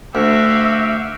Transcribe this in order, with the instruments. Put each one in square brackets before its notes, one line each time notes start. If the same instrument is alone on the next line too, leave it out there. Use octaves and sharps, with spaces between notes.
[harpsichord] D2 [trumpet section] F#4 G4 F5 [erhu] E5